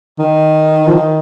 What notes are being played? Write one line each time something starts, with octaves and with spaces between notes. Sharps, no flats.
D#3
F3
D#3